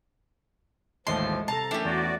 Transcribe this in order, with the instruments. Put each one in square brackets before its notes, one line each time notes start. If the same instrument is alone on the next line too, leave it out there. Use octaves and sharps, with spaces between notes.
[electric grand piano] A1 D#2 A5 [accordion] F3 [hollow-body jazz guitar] G#3 A3 [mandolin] C6
[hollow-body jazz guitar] C2 [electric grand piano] A4 C7 [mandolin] A5 [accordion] A#5
[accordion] F#2 [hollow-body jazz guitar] E3 A3 C#4 [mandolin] D4 G4
[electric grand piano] E2 [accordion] F#4 D5